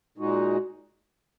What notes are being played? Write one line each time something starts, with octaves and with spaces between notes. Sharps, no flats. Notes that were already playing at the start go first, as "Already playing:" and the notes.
A#2 G#3 D#4 F#4